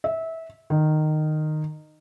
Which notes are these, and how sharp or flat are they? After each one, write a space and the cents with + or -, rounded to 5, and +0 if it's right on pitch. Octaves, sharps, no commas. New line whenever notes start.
E5 -20
D#3 -15